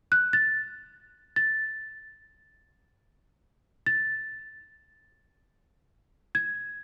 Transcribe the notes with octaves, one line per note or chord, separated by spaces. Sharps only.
F#6
A6
A6
A6
G#6